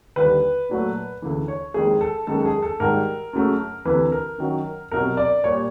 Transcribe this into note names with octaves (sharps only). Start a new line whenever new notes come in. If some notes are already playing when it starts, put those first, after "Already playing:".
D#2 D3 G3 B4
A#2 F#3 A3
D2 C#3 E3
C#5
F2 C3 D#3 G#3 G#4
A4
F#2 D#3 G#3 A4
A4
G#4
A4
G#2 D#3 G3 A#4
F#2 C#3 F#3 A3
D2 C3 E3 B4
A#4
F#2 D#3 F#3
C2 B2 F#3 A#4
D5
A#2 G3 C#5